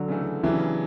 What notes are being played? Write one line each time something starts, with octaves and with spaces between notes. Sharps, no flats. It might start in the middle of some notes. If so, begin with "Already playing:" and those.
Already playing: D3 F#3
C#3 E3 A3
C#3 E3 F#3 B3 D4 G4